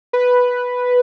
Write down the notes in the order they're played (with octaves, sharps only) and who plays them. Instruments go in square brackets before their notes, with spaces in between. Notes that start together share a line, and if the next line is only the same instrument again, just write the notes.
[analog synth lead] B4